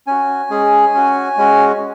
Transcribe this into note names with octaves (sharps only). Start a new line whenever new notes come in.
C#4 F#4 G#5
G#3 C#4 G#4
C#4 F#4
G#3 C#4 F#4